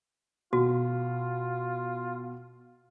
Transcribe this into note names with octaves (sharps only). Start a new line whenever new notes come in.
B2 F4 F#4